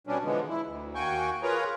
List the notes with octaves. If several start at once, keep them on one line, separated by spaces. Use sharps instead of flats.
B2 G3 C#4 D4
D3 E3 F3 G#3 B3
E4
D2
D#2 A#3 F#4 G5 G#5 C#6
F4 G#4 A#4 B4 C#5 A#5